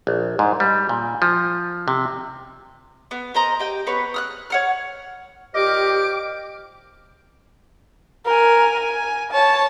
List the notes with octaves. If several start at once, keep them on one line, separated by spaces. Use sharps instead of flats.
A#1
G#2
G3
A#2
F3
C3
B3
A#4 C5 D#5 A#5
G4 D#5 G5
B3 B4 C#5 C#6
D#6 F6 F#6
C#5 F#5 F6
A#2 G4 C5 D#5 D6 F6
A#4 G#5
G#5
C#5 A5